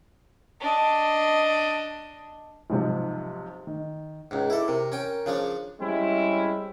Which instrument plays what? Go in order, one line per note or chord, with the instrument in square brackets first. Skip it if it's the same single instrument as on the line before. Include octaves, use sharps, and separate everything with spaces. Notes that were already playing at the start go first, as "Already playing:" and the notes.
[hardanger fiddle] D4 D#5
[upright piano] B1 G#2 C3 F3
D#3
[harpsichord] C#2 G#2
[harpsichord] E4 A4 [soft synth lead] D6
[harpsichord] C3 [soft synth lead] A#4
[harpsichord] C#4 G5
C#3 F3 D4
[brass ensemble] G3 G#3 C4 C#4 E4